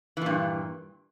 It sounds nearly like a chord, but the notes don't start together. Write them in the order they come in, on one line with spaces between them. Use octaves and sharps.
E3 A#2 G2